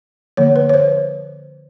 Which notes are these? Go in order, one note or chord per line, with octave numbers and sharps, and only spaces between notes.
D3 F3 A#3 C#5
B4
C#5
C5